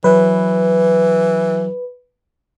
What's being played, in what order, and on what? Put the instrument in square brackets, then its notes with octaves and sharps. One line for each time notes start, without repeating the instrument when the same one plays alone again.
[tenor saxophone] E3 [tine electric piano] F#3 [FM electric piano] B4